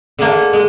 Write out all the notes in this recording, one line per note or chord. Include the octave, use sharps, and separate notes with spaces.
D3 G#3 A#3
G#3